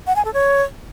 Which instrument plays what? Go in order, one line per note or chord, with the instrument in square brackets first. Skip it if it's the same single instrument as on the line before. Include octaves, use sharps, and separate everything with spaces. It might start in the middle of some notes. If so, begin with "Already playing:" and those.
[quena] F#5
G#5
A4
C#5